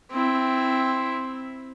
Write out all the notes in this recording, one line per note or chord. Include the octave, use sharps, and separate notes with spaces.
C4 E4